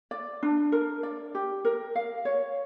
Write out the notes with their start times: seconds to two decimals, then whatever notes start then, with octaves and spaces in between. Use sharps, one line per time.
0.11 D5
0.43 D4
0.72 A#4
1.03 D5
1.35 G4
1.65 A#4
1.95 F5
2.25 C#5